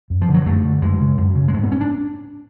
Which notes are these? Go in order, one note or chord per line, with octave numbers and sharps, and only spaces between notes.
F#2
F3
D3
F#3
F#2 A3
D3
F#2 G#3
C#3
F#2
C#3
G#3
G#2 A3
B3
C#4
D4